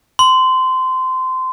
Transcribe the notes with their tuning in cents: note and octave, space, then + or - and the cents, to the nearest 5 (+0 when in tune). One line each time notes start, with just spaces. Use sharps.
C6 -20